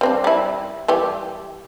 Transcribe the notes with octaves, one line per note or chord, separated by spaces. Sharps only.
G3 C4 D4
G3 E4
E3 G3 G4